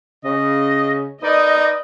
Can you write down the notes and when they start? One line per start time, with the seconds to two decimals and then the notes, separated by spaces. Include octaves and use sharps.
0.25 C#3 D#5
1.23 D#4 A#4 B4 D5 D#5